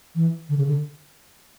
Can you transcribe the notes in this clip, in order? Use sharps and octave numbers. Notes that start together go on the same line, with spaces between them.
E3
D3
C#3
D3